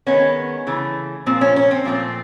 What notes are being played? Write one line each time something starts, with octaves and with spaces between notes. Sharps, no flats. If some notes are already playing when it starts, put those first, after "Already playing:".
D#3 G#3 B3 C#4
C#3 E3 A3
A#2 F3 A#3 C4
C#4
C#4
C4
A#2 F3 A3 C4